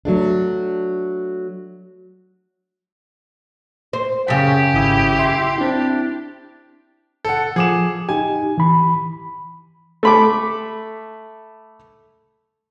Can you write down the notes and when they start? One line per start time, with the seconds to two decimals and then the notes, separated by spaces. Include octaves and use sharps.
0.05 F#3 A3 D4
3.93 C5
4.28 F#2 C#3 G4 B6
4.74 G#1 E4 D#6
5.19 E5 C6
5.58 C4 D4 E4
7.25 A4 F#5
7.56 F3 G#4 D6 E7
8.09 D#4 G4 G#5
8.58 E3 B5
10.03 A3 B5 D6